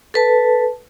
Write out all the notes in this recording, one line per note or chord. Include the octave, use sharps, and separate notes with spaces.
A4 B4 A5